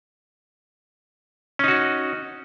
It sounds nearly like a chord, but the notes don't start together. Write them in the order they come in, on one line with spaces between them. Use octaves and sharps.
C#4 D#4 F#4